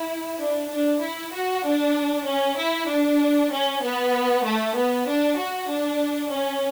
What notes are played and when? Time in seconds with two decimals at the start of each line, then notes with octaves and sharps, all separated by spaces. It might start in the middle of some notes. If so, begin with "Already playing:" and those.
Already playing: E4
0.39 D4
0.71 D4
1.02 E4
1.32 F#4
1.64 D4
2.25 C#4
2.57 E4
2.88 D4
3.51 C#4
3.82 B3
4.43 A3
4.75 B3
5.07 D4
5.37 F#4
5.69 D4
6.31 C#4